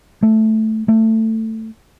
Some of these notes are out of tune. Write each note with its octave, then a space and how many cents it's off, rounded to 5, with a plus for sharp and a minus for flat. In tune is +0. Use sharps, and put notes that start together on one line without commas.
A3 -5
A3 +15